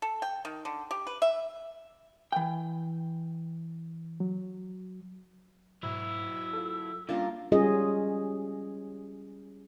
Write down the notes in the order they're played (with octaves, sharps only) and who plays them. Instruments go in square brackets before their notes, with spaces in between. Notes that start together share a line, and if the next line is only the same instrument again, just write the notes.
[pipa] A4
G5
D#3
D3
G4
B4
E5
[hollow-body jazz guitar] E3 G5
[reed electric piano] F#3
[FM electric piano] G#2 B2 [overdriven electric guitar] F#3 E4 [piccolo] E6
[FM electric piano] F4 A4
[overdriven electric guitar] G2 [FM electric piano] A#3 C#4 D4 [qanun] F4 A#4 A5
[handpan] G3 C#4 F4 G#4 D#5